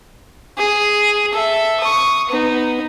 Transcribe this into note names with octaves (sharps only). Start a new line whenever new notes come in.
G#4
A4 E5
C#6 D#6
B3 D#4